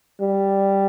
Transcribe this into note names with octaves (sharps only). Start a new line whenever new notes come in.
G3